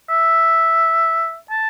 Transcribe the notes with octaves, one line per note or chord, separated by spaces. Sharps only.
E5
A5